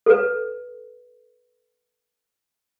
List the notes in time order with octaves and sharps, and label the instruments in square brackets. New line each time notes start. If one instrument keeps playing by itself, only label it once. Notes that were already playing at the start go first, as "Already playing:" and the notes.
[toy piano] A4 B4